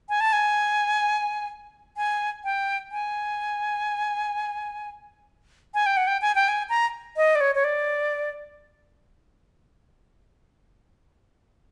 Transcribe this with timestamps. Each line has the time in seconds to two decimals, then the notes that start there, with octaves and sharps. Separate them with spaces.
0.09 G#5
0.20 A5
0.33 G#5
1.97 G#5
2.44 G5
2.92 G#5
5.74 G#5
5.86 G5
5.97 F#5
6.07 G5
6.22 G#5
6.35 G5
6.48 G#5
6.69 A#5
7.17 D#5
7.35 D5
7.41 C#5
7.55 C#5
7.64 D5